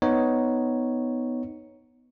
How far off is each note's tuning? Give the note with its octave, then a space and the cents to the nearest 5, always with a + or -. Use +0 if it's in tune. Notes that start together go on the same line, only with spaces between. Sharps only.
B3 +10 D#4 +0 C#5 +0